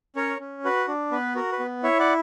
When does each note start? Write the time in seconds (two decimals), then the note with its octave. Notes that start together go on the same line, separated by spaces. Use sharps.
0.16 C#4 A#4 C#5
0.40 C#4
0.65 F#4 B4
0.88 D4
1.11 B3 B4
1.35 F#4 A#4
1.52 B4
1.59 B3
1.83 E4 C#5 E5
1.99 D5 F#5